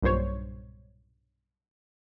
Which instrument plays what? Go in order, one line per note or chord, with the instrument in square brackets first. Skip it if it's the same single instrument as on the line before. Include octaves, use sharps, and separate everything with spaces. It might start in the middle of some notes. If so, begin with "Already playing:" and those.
[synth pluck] B1 G2 A#2 C5 C#5